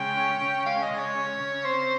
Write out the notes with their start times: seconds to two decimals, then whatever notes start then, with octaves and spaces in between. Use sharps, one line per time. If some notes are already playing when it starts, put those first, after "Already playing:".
Already playing: C#3 G#3 G5
0.17 C#4
0.41 C#3
0.66 G#3 F5
0.82 D#5
0.90 C#3
0.99 C#5
1.15 C#4
1.40 C#3
1.64 C4 C5